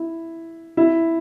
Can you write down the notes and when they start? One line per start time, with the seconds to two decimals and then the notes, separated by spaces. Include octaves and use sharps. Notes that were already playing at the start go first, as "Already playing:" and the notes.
Already playing: E4
0.77 E4